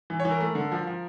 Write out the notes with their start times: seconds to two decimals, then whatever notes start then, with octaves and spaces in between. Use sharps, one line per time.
0.10 E3
0.20 C#5
0.25 E3
0.30 A#4
0.41 A3
0.55 D3
0.72 F3
0.87 F3